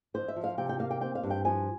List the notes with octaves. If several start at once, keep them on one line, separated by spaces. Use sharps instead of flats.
F2 C5
E5
F3
F5
C3 G5
G5
A#3 F5
G5
C4 G5
F5
G2
G5
F3 G#5